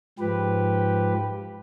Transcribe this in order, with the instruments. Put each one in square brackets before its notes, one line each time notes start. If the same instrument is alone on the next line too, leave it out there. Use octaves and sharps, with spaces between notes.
[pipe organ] G#2 F3 G4 B4